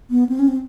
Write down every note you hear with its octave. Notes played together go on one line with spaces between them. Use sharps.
B3
C4
C#4
C4